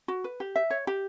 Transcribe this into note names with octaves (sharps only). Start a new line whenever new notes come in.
F#4
B4
G4
E5
C#5
G4